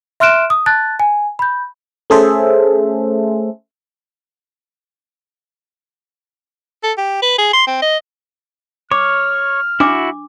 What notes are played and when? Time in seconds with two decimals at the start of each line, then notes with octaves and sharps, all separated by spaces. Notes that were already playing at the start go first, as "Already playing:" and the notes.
0.20 E5 C6 F6 F#6 D7 E7
0.50 D#6
0.66 A5 F#6 A6
1.00 G#5
1.39 B5 G6
2.10 A3 C#4 G#4 A4 C5 E5
6.83 A4
6.97 G4
7.22 B4
7.38 G#4
7.53 C6
7.67 C4
7.82 D#5
8.92 C#5 D6 F6
9.80 D4 E4 F#4 D6